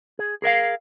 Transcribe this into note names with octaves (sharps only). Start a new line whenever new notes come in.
G#4
G#4 A#4 E5 F5